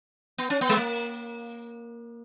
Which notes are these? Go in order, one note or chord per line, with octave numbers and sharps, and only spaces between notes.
B3
C#4
B3
G#3
A#3